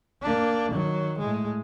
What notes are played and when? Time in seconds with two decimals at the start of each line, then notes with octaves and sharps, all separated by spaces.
0.22 A#3 D4
0.72 D#3 F#3
1.19 A2 G#3